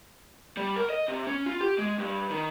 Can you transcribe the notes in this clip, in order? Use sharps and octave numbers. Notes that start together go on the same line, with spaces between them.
G3
A#4
D#5
C3
C#4
F4
G4
G#3
G2
D#3